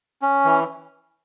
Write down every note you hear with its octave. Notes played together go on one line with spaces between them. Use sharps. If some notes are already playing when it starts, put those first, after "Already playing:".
C#4
E3